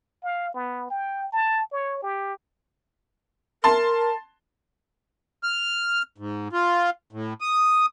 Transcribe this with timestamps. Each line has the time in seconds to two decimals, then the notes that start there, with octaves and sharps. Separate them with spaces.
0.23 F5
0.54 B3
0.90 G5
1.32 A5
1.72 C#5
2.03 G4
3.64 A#4 A5 C6
5.43 F6
6.18 G#2
6.53 F4
7.13 A2
7.41 D#6